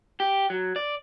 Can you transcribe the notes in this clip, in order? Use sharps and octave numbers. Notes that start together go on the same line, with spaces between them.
G4
F#3
D5